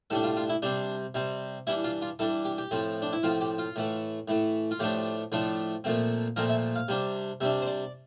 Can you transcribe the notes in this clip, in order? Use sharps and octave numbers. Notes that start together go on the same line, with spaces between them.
A2 G3 D4 A4
F4
F4
E4
C3 G3 C4 D4
C3 G3 C4
E3 G3 D4 E4
F4
F4
E3 G3 D4 A4
G4
G4
A2 F3 C4
D4
E4
A2 F3 C4 F4
G4
F4
A2 E3 A3
A2 E3 A3
F4
A2 F3 A3 D4 G4
A2 F3 A3 D4
A#2 F3 A3 C4
A#2 F3 A3 C4 A#4
E5
F5
C3 G3 D4
C3 G3 D4 E5
C5
D5